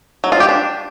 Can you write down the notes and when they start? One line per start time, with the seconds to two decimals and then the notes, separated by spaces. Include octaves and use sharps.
0.24 F#3
0.32 F4
0.40 G4
0.49 D4